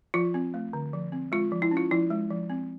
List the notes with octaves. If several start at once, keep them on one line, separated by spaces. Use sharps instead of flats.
F3 F4
C4
A3
D3
F3
C4
G#3 F4
F3
E4
C#4
F4
F3 E4
G#3
F3
C4